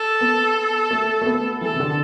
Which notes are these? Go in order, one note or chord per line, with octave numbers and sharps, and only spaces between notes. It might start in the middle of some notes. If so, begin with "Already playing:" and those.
Already playing: A4
B3
A3
A3
B3
E3 A4
C3
D3